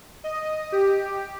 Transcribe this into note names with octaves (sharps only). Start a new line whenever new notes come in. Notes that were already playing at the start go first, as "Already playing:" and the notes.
D#5
G4